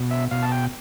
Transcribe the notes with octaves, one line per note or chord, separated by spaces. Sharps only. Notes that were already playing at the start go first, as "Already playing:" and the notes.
Already playing: B2
E5
B2 F5
A5
G5